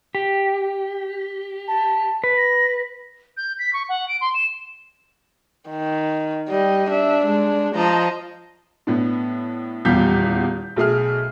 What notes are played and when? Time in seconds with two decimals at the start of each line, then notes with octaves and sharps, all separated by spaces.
0.15 G4
1.68 A5
2.24 B4
2.37 A#6
3.37 G6
3.59 B6
3.73 C#6
3.89 F#5
4.08 D7
4.21 C6
4.34 E7
5.70 D#3
6.49 G3 D#5
6.90 D4 E5
7.25 G#3
7.75 F3 D#5 A5 A#5
8.87 A2 B3 D4
9.85 D#1 E2 G3 F5 G6 B6
10.76 B1 A3 G#4 F6